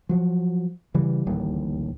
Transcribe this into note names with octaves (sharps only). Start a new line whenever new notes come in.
F3 F#3
C#3 E3 G3
D1 A1 D#2 G3